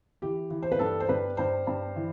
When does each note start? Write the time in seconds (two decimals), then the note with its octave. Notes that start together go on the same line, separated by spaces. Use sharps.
0.22 E3 G4
0.50 E3
0.62 C5
0.72 B4
0.79 G2 A4
1.00 C5
1.09 G2 B4
1.37 G2 C5
1.67 G2
1.96 E3